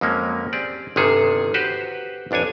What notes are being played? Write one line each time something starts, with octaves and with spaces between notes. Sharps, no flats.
F2 F#3 G#3 A#3 C#4
C4 G4 G#4 D5
G1 C3 D#3 G#4 A4
F#4 G4 B4 C5
A1 F2 D4 C#5 G#5